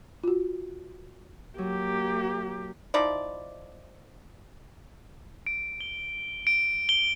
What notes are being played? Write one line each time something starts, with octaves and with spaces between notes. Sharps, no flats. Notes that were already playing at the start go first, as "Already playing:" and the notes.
F4 F#4
F#3 A#3 G4
F3 D#4 E4 D5
D7
G7
D7
G7